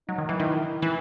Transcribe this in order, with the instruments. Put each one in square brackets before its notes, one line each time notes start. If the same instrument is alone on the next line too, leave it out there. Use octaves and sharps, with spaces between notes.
[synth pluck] F#3 [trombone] D#4
[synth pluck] D#3
E3
[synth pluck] D#3 [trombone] E4
[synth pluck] E3